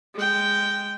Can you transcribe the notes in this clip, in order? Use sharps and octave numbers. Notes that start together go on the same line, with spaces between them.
G#3 G5